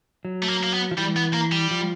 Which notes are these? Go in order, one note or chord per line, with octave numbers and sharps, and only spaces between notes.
F#3
A3
A#3
A#3
B3
F3
E3 G3
B3
A#3
G3
F3